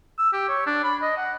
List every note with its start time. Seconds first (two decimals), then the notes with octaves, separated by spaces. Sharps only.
0.19 E6
0.33 G4
0.49 C#5
0.67 D4
0.84 B5
1.02 D#5
1.17 F#5